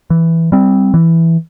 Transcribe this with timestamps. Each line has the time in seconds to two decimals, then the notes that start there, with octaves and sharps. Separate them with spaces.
0.10 E3
0.52 G3 C4
0.94 E3